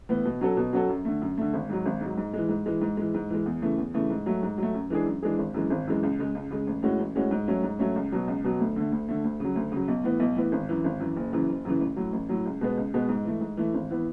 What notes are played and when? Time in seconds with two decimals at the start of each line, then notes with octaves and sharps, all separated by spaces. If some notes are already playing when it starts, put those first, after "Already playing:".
0.09 A2 E3 B3
0.25 B2
0.41 F#3 C#4 F#4 A4
0.57 B2
0.73 F#3 C#4 F#4 A4
0.89 F#2
1.05 D3 A3
1.22 F#2
1.38 D3 A3
1.54 G#1
1.69 G#2 F#3
1.86 G#1
2.01 G#2 F#3
2.18 G#2
2.34 E3 G#3
2.49 G#2
2.66 E3 G#3
2.81 G#2
2.97 E3 G#3
3.14 G#2
3.30 E3 G#3
3.46 E2
3.62 C#3 E3 A3
3.78 E2
3.94 C#3 E3 A3
4.10 G#2
4.26 F#3 A3
4.43 G#2
4.58 F#3 A3
4.74 F#2
4.90 E3 G#3 D4 G#4
5.06 F#2
5.23 E3 G#3 D4 G#4
5.38 G#1
5.54 F#2 E3 G#3
5.70 G#1
5.87 F#2 E3 G#3
6.03 C#2
6.19 C#3 G#3
6.35 C#2
6.51 C#3 G#3
6.67 A1
6.83 A2 G#3 C#4 F#4
6.99 A1
7.16 A2 G#3 C#4 F#4
7.31 G#2
7.48 F#3 A3 C#4
7.63 G#2
7.79 F#3 A3 C#4
7.96 C#2
8.12 B2 F#3
8.28 C#2
8.44 B2 F#3
8.60 D2
8.76 D3 A3
8.92 D2
9.09 D3 A3
9.24 D2
9.40 C#3 F#3
9.56 D2
9.72 C#3 F#3
9.88 B1
10.04 A2 E3 B3
10.20 B1
10.36 A2 E3 B3
10.52 G#1
10.69 F#2 E3
10.84 G#1
11.00 F#2 E3
11.16 F#1
11.33 F#2 C#3 E3
11.49 F#1
11.65 F#2 C#3 E3
11.80 A1
11.96 A2 F#3
12.13 A1
12.29 A2 F#3
12.46 C#2
12.61 B2 G#3 B3
12.77 C#2
12.94 B2 G#3 B3
13.09 G#2
13.25 E3 A3
13.41 G#2
13.57 E3 A3
13.74 G#1
13.90 E3 B3